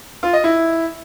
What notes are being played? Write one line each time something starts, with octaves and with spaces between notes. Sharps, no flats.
F4
D#5
E4